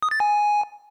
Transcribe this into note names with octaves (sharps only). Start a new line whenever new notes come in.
D#6
A6
G#5